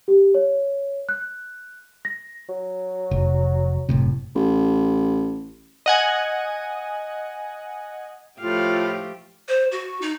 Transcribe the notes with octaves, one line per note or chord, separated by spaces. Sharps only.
G4
C#5
F#6
A#6
F#3
F1
F#1 A2 C3
A1
D#5 F#5 G#5
A2 F3 A3 F4 G4 F5
C5
F#4
D#4